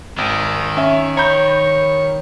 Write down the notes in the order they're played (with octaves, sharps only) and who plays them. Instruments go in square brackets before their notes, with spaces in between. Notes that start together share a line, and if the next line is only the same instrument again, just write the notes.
[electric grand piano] G#1 [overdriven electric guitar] D#3
[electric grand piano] C#4 E5
[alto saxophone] C#5 [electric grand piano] A#5 B5 G6